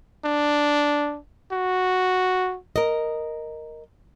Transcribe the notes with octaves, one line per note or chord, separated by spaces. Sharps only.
D4
F#4
A#4 D#5